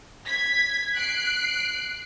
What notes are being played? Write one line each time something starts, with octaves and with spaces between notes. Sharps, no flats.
G#6 B6
F#6 C7 D7